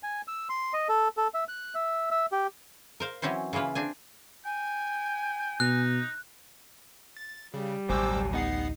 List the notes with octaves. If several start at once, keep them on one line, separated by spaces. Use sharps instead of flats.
G#5
E6
C6
D#5
A4
A4
E5
F#6
E5
E5
G4
A#4 C5 F5
E3 F#3 C4 C#4 C5
C#3 E3 A#3 F4 B4
C4 D4 G#5
G5 G#5
B2 D#4 F#6
A6
C#3 G3
A1 D2 B2 F#3 C5 G#5 D6 E6
B3 D#4 F#5 C7